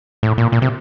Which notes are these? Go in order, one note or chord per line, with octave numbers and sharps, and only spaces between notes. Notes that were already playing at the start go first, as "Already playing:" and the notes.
A2
A#2
A#2
C3